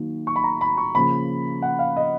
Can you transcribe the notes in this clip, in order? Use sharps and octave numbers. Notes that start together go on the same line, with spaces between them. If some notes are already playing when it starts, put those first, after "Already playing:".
Already playing: D#3 F#3 A#3
C#6
B5
A#5
B5
C#6
C#3 F3 A#3 B5
F#5
F5
D#5